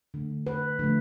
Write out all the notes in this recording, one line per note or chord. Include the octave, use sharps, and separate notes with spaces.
D3 A3
B4
D3 F3 A3